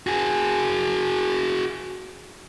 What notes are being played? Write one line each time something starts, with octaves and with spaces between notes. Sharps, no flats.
F#4 G#4